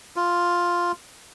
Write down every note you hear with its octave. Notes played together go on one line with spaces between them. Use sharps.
F4